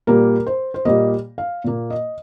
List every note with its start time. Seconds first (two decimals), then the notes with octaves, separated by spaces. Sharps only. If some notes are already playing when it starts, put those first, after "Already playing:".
0.07 A#2 G3 A#3 A#4
0.47 C5
0.74 C5
0.85 A#2 G3 A#3 D#5
1.38 F5
1.64 A#2 A#3
1.90 D#5